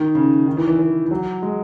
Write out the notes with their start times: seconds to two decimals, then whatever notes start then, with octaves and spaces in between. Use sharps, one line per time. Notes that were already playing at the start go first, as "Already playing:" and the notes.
Already playing: D#3
0.15 C#3
0.47 D#3
0.57 E3
0.67 E3
0.79 E3
1.06 E3
1.11 F#3
1.42 G#3